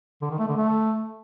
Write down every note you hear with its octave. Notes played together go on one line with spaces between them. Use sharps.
D3
D#3
A3
D3
A3